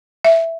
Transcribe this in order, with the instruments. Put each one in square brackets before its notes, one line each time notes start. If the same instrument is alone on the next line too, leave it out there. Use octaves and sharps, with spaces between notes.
[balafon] E5